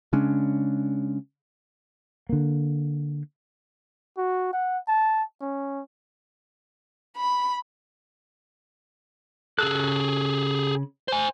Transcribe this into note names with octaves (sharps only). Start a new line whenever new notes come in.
C#3 G#3 C#4 D4
D3 A#3
F#4
F#5
A5
C#4
B5
C#3 G#4 A4 E6 F#6
C5 G#5